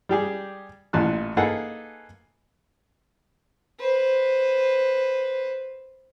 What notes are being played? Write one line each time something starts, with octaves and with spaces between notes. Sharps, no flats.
G3 G4 G#4
A1 A#2 A5 F#6
A#3 D#4 G#4 A4 B4 F#5
B4 C5